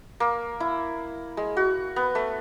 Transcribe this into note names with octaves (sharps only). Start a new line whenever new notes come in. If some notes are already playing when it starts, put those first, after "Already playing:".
A#3
E4
G#3
F#4
B3
A3